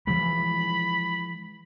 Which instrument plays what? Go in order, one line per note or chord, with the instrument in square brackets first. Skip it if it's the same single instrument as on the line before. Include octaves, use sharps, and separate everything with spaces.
[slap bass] E3 F3 G#3 [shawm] B5